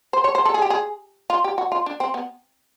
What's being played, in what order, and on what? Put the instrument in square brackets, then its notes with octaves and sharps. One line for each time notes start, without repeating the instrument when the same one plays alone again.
[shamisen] C5
C#5
C5
A4
G#4
G4
G#4
F4
G4
F#4
F4
D4
C4
B3